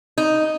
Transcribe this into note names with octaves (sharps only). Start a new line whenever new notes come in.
D#4